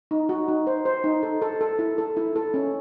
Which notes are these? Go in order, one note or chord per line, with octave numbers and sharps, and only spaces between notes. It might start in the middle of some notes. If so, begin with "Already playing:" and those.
D#4
F#4
D#4
C5
C5
D#4
A4
A4
A4
E4
A4
E4
A4
C#4